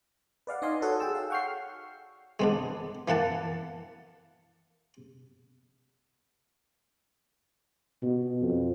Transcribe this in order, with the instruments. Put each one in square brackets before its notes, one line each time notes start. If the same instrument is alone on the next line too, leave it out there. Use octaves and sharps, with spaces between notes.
[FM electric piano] B4 D5 F5 F#5
D#4 D5 D#5 G#5 C6
F#4 A4 C#5 F#5
G#4 A4 G5 A5 E6
F5
F#5 G5 C#6 F6 G6 C7
[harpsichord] G#3 B3 D4
E3 A#3 F#5 A5
[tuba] B2
F2